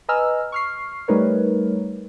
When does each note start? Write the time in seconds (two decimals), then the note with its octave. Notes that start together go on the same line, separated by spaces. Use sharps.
0.09 B4 D#5 G#5 A#5 E6 F6
0.52 C#6 F6 C7
1.08 G3 A3 D#4 A#4 B4 C#5